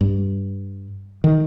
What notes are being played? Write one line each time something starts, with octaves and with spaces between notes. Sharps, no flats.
G2
D#3